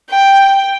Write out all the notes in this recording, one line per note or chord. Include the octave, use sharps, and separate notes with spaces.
G5